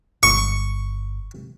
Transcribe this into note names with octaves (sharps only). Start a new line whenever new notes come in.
G1 C#6